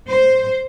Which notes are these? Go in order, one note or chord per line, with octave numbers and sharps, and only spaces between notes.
C5